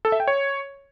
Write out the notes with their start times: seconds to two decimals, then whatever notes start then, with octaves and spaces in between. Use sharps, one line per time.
0.05 A4
0.12 E5
0.20 G5
0.28 C#5